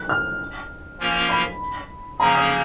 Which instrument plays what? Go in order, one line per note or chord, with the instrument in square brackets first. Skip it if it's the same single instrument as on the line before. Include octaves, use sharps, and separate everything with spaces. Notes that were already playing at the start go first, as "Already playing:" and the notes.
Already playing: [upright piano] F#6
F6
[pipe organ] F3 A#3 C#4 F4 A#4
[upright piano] B5
[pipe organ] C#3 F3 A#3 C#4 G#4 [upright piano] A#5
[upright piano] D#6